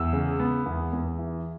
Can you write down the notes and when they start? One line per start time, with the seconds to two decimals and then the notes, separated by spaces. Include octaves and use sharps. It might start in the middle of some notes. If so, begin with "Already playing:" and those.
Already playing: E2 E6
0.13 C#3
0.39 B3
0.66 E2
0.93 E2
1.18 E3